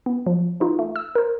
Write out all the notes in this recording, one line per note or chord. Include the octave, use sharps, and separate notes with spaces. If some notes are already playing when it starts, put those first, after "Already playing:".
B3
F3
E3 D#4 F4
A3
E6
A#4 C5